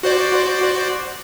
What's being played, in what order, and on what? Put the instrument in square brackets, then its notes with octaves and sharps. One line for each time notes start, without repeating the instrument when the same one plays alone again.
[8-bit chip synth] F#4 C5 D5